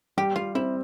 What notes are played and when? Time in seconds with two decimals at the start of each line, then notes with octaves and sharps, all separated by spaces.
0.17 G3 G4
0.36 G3 F4
0.55 C4 E4